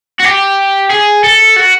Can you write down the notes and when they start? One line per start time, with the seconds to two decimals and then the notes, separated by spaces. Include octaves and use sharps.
0.19 F#4
0.24 G4
0.90 G#4
1.24 A4
1.56 F#4